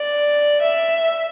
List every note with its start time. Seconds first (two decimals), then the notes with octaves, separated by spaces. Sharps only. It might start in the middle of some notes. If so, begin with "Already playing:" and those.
Already playing: D5
0.62 E5